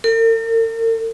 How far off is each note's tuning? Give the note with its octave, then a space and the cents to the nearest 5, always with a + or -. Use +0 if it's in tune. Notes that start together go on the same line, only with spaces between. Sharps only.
A#4 -45